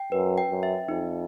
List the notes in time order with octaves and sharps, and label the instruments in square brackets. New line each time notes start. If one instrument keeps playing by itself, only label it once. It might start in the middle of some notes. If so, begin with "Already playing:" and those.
Already playing: [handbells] G5
[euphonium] F#2 [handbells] B4
[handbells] G5
[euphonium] F#2
[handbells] E5
[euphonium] F2 [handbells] D#4